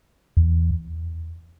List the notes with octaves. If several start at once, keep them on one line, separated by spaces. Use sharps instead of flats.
E2